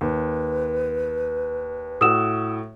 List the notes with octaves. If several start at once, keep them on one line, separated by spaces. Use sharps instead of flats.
D#2 B4
A2 F#4 D#6 E6 E7